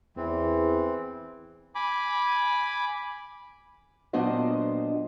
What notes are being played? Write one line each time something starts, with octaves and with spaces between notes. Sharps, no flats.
E2 E3 C4
G#5 B5 D6
A#2 F#3 B3 D4 C5 D#5